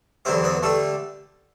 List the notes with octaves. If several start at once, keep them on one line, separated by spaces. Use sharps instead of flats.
E2 D3 F#3 C4 E4 G4
B3 B4
D3 G3 A3 D4 A4